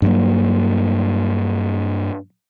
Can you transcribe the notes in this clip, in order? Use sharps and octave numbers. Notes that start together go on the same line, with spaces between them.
G2 F#3 A#3